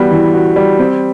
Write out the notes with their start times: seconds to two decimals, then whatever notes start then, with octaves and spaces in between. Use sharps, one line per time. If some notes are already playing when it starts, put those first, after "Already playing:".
Already playing: E3 G3 B3 F#4
0.12 E3
0.34 F#4
0.56 G3
0.79 C4